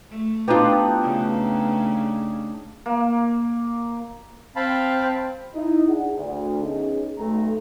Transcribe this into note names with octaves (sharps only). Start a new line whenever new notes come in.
A3
B3 D4 D#4 F4 G4
C#3 A3
A#3
C4 F5 A5 B5
D#4 E4
D4 G#4 F#5
D2
B3 C#4 D#4 G#4
B1 A3 A#5